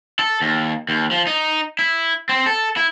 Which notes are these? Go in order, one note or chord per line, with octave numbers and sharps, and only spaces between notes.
A4
D#2
D#2
F3
D#4
E4
C4
A4
E4